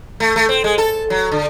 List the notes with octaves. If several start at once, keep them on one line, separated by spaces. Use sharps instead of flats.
A3
A3
C4
G#3
A4
F#3
D3